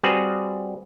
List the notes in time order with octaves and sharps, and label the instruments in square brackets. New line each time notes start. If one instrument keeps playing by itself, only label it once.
[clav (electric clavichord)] G3 C4 F#4 G#4 B4